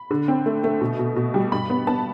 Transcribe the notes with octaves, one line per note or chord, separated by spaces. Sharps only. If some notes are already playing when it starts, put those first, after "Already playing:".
Already playing: B5
D3
C4
A3
A3
B2
B2
B2
G3
G2 B5
B3
B3 A5